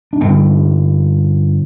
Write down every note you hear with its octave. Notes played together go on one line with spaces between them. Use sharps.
D4
G2 D3 C4